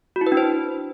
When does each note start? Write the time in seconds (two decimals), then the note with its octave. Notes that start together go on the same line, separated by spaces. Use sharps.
0.16 F#4
0.21 E4
0.27 B4
0.32 D4
0.37 C5